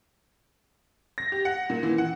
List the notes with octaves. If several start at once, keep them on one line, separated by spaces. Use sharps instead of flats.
A#6
G4
F#5
A#2
E3
F#5